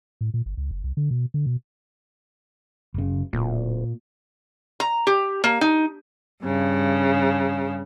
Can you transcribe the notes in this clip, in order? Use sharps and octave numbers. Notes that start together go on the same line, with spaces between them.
A2
A#2
G1
C#2
F#1
C2
D3
B2
D3
B2
F#1 C#3
D1 A#2
A#5
G4
A#3
D#4
G2 C#3